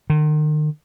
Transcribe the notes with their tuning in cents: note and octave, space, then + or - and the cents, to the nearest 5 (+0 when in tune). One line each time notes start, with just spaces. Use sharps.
D#3 -40